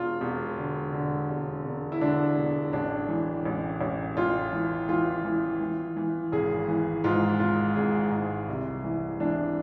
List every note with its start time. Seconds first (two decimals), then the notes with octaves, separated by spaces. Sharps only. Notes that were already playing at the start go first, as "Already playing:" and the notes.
Already playing: E1 F4
0.21 E1
0.58 D3
0.93 D3
1.30 E1
1.65 E1
1.92 E4
2.01 D3 D4
2.37 E1
2.73 A1 D4
3.08 E3
3.45 A1
3.81 A1
4.17 A1 F4
4.53 E3
4.89 E3 F4
5.25 E3
5.61 E3
5.97 E3
6.32 G#1 G#4
6.68 E3
7.04 G#2 F4
7.40 G#1 F4
7.76 G#1 G#4
8.12 G#2
8.48 C2
8.84 E3
9.20 E3 D4